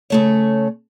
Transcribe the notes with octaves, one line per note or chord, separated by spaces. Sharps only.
C#3 A3 C#5